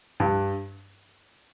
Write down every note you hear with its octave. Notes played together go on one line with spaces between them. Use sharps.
G2